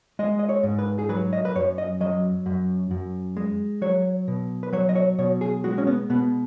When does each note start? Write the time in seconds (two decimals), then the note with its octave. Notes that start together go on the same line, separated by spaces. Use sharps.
0.19 G#3 D#5
0.39 D#5
0.49 C#5
0.63 G#2
0.79 B4
0.99 G#4
1.09 F#3 B4
1.33 D#5
1.45 B4
1.55 F#2 C#5
1.78 D#5
2.01 F#3 D#5
2.46 F#2
2.91 F#2
3.37 G#3
3.82 F#3 C#5
4.28 B2
4.63 B4
4.73 F#3 C#5
4.89 D#5
4.95 C#5
5.19 B2 C#5
5.41 G#4
5.64 G#3 F#4
5.78 C#4
5.87 B3
6.10 B2 B3